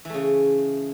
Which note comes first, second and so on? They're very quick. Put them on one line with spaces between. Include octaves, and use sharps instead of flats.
E3 A3 C#3